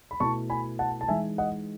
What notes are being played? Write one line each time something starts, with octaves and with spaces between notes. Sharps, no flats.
B5
B2 A3 E4 A5 C#6
G#5 B5
F#5 A5
A5
E3 G#3 D#4 E5 G#5
D#5 F#5